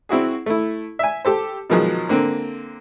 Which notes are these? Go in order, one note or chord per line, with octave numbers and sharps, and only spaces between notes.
C4 E4 F#4 G#4
A3 E4
E5 G#5
G4 A4 C5
B2 D#3 F3 F#3 G#3
D3 A#3 C4